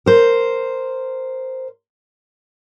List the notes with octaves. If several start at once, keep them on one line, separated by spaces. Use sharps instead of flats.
A#4 C5